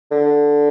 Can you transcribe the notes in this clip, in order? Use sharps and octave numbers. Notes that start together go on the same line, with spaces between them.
D3